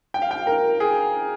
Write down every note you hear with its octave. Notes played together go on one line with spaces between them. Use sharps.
G5
F5
G5
A#4
G#4